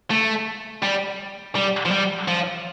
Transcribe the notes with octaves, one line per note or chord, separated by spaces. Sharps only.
A3
G3
G3
F3
G3
F3